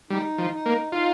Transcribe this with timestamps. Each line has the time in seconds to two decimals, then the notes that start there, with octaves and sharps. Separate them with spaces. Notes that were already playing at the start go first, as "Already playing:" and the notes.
0.10 G3 D#4
0.38 F3
0.52 D#4
0.66 A#3
0.92 D#4 F4